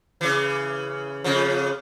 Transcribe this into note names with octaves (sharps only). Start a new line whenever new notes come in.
C#3 E3
F2 C#3 F3